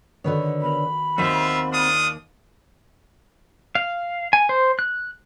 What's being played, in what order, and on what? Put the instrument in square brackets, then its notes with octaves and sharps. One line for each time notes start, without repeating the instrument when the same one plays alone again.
[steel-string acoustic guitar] D3 B4 C#5 [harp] D#3 F#4
[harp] B3 A#4 [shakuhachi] B5
[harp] D#2 [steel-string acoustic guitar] C4 F#4 [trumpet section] F4 E5
[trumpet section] D4 F4 D#6
[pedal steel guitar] F5
G#5
C5
F#6